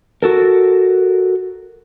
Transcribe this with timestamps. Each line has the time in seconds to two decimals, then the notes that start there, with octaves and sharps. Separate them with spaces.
0.23 F#4 A4 A#4